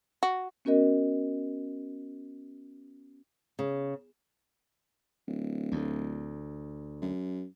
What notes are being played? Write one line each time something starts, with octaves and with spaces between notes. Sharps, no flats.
F#4
B3 C#4 F#4 A#4 D#5
C#3
D1
D2
F#2